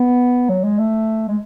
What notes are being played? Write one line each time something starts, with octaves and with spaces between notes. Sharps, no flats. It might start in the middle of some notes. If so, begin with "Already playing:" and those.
Already playing: B3
F#3
G#3
A3
G#3